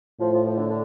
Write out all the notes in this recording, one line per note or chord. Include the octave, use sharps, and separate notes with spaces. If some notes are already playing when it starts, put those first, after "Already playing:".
A2 F3
F3
F3
D3
D3